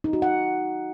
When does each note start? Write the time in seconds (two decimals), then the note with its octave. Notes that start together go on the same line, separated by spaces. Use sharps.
0.04 D#4
0.13 F#4
0.22 F#5